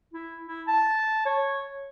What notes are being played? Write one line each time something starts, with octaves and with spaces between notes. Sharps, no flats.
E4
E4
A5
C#5